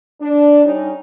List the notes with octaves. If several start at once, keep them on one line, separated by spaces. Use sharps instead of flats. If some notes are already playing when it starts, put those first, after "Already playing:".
D4
G3 C#4 D#4